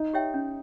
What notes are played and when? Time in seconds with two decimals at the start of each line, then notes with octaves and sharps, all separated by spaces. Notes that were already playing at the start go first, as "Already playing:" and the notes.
Already playing: D#4
0.13 G4 C#5 E5 G5
0.34 C#4